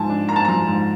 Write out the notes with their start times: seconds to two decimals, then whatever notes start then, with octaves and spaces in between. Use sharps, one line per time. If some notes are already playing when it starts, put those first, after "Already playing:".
Already playing: G#2 F3 G#5 A5
0.10 D4
0.29 A#3 A#5
0.36 A5
0.45 F3 A#5
0.67 G#2